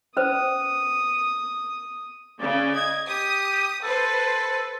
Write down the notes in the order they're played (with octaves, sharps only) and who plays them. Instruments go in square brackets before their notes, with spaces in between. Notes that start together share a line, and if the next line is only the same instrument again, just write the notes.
[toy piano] C#4 B4 C5 [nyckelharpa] D#6
[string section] C#3 [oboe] D5
[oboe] D#5 [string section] G#6
[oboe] G4 [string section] D#6
[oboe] A4 [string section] B4 C5